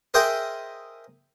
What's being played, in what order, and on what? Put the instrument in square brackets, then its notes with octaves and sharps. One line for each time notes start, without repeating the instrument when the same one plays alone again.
[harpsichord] G#4 A#4 C5 D#5 E5 G5